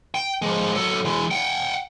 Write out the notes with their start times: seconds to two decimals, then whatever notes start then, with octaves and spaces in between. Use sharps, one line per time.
0.15 G5
0.42 F3 G#3
0.75 F#3 A4
1.05 E3 G#3
1.31 F#5 G5